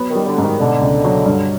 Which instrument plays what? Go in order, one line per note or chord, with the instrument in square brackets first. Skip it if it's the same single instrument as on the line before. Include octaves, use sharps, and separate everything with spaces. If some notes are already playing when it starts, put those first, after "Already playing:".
Already playing: [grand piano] F#3 B3
[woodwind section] D#3
[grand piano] G3
[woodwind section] D3
[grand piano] G#2
[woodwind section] D#3
[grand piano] B2 [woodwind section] D3
[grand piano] C#2
F#3
G2